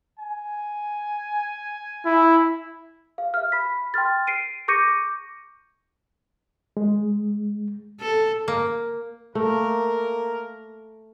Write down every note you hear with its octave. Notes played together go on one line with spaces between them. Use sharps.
G#5
E4
F5
E5 F6
B5 B6
G5 C6 F6 A6
C7 D7 D#7
C#6 D6 G6 A#6 C#7 D#7
G#3
A4
A#3
A3 A#3 A#4